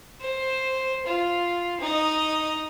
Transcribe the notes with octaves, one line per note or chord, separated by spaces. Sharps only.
C5
F4
D#4 D#5